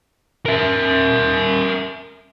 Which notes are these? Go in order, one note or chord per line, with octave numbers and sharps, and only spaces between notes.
A#4 E5